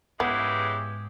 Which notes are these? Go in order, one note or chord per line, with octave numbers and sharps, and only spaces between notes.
G#2 C#3 E3 G#3 B3 G4